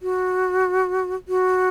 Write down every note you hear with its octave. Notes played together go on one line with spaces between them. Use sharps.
F#4
F#4